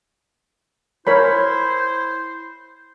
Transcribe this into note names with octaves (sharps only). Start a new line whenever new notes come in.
E4 A#4 C5 C#5 B5